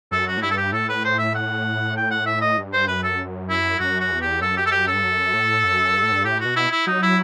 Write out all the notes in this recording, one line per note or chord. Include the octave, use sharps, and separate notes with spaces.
F#2 A4
F#4
A2
G2 E4
A4
G4
A2 A4
B4
C5
E5
F#5
G5
F#5
E5
D#5
G2
C5
F#2 B4
A4
E4
F#2 F#4
F#4
E2
G4
F#2 A4
G4
A4
G4
A4
G2
F#2
A2
F#2
G2
A2
G2
A2 G4
B2 F#4
E4
E4
F#3 D#4
E4